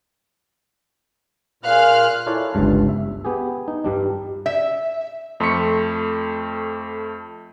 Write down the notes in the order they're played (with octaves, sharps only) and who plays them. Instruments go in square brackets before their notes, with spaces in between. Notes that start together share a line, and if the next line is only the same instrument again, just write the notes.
[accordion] A#2 F6 F#6 [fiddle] G#4 F5
[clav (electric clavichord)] E4 F4 A4 C#5 D5
G1 C#2 G2 A5
E5
B3 G4 G#4
D#4
G2 G3 D4
[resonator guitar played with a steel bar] E5
[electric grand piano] F2 A3 C6 C#6 B6 C#7